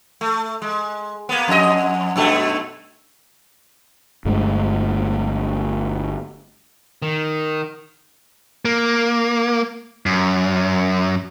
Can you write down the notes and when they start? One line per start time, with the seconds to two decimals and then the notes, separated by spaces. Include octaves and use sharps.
0.21 A3
0.62 G#3
1.29 A#3 B3
1.48 F2 D#5
2.16 F#2 B2 A3
4.25 G1 G2 G#3 A3
7.02 D#3
8.65 A#3
10.06 F#2